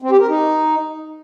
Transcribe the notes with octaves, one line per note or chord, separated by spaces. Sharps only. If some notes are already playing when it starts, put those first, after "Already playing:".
C4
G4
A#4
D#4